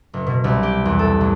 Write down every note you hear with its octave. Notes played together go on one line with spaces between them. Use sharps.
F#1
B2
C2
G4
E2
A4
A1